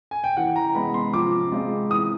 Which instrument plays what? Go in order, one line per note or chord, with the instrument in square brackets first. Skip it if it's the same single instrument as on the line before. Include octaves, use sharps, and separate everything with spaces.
[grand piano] G#5
G5
[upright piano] E3 [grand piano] F#5
[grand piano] A#5
[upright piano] G#3 B3 [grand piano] B5
[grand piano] C6
[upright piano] F3 [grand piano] D6
[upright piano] G#3 C4 F4 G#4
[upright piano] E3 [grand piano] D#6